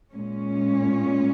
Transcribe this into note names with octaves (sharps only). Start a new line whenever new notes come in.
A#2 G#3 C#4